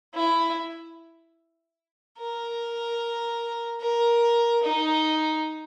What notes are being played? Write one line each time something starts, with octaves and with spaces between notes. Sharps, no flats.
E4
A#4
A#4
D#4